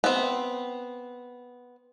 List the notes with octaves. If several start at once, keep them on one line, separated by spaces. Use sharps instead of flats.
B3 C4